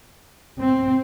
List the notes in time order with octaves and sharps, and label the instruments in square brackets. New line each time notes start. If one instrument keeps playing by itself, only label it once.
[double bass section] C4